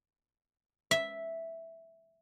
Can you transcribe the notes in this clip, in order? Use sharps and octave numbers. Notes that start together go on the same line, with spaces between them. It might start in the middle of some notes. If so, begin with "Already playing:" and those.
E5